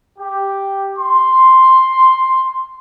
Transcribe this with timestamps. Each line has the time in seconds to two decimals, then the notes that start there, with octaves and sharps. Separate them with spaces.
0.18 G4
0.97 C6